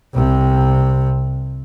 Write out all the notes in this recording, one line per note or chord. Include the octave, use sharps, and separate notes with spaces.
C2 C3